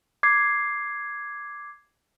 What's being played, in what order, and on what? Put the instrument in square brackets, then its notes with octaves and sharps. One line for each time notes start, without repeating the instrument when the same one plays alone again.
[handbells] D6 G#6 C7